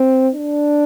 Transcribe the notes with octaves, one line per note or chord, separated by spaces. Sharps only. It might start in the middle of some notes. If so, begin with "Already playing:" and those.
Already playing: C4
D4